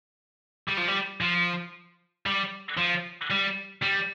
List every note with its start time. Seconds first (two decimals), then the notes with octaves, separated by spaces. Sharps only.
0.68 G3
0.77 F3
0.88 G3
1.21 F3
2.26 G3
2.77 F3
3.31 G3
3.83 G3